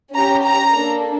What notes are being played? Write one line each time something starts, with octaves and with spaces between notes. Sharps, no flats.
C#4 G4 A#5
A#5
A#3 D4 A4